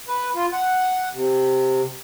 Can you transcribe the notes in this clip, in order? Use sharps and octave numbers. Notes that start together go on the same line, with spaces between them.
B4
F4
F#5
C3